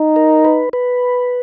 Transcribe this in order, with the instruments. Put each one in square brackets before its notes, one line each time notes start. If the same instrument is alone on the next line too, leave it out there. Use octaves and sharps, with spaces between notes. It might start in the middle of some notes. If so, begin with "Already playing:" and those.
Already playing: [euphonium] D#4
[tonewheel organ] A#4
B4
B4